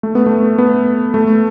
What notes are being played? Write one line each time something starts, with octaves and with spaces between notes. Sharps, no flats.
A3
B3
A3
B3
A3